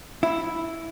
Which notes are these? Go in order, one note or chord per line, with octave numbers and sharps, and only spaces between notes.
E4